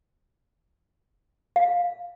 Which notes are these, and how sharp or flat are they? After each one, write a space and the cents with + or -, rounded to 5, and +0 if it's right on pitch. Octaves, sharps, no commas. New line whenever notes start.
F5 +5